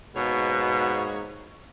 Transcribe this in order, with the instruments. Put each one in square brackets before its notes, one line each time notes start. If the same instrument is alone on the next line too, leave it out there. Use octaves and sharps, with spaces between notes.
[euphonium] G#2 [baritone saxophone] B2 [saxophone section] A#3 G#4 C#5